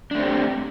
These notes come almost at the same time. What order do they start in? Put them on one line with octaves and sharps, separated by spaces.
D4 A3 C4 G4